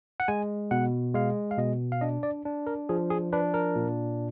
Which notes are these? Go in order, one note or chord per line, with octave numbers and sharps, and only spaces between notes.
F#5
G#3 G#5
B2 F#5
G#3 F5
F5
B2 D#5
F5
D4 D#5
D5
D4
A#4
F3 G#4
G#4
D4 B4
A#4
A#2